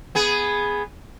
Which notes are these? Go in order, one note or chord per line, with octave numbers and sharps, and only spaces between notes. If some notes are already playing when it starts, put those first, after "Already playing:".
B3 G#4